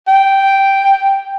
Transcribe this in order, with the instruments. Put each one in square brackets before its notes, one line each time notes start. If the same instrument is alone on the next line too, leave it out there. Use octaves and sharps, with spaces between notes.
[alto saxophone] G5